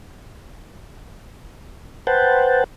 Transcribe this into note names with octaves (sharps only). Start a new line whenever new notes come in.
B4 C5 F#5 G5 A5